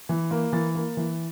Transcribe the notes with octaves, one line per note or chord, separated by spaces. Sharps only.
E3
A#3
E3 A6
A#3
E3